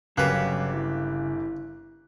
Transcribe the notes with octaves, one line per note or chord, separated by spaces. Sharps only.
G1 C#3 F#3 A#3 G4 B4 F#6
E4